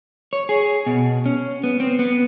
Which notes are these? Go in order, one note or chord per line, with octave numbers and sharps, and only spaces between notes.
C#5
G#4
B2
C#4
B3
C4
B3